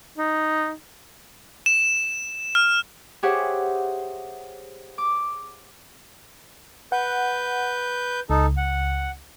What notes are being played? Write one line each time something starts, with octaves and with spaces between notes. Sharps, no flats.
D#4
E7
F6
G4 G#4 C5 C#5 E5 F#5
D6
B4 F#5 G6
C#2 D#4 A4
F#5